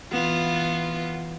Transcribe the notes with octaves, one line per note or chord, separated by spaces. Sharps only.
E3 B3 F4